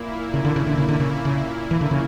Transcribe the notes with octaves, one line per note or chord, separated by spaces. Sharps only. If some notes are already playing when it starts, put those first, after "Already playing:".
Already playing: A#2 A#3 E4
C#3
D3
C#3
D3
C#3
D3
C#3
C#3
E3
D3
C#3